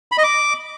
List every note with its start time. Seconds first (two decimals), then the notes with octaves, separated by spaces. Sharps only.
0.12 B5
0.18 D#5
0.24 D6